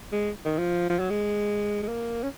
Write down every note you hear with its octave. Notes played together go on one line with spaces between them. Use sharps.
G#3
D#3
F3
F3
F#3
G#3
G#3
A#3
C#4